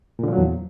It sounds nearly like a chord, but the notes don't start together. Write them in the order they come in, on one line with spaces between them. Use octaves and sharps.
A#2 D3 F3 F#3 E2